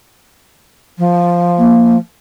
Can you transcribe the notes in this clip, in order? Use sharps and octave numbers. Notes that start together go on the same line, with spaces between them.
F3
A#3